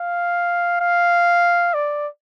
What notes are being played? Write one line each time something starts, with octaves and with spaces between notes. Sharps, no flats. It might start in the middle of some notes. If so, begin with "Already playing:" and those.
Already playing: F5
F5
D5